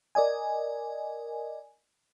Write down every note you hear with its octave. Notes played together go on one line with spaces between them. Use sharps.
A#4 D5 D#5 G#5